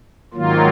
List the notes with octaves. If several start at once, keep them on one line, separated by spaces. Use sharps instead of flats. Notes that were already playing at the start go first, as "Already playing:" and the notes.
G#2 D#3 F#3 A#3 F4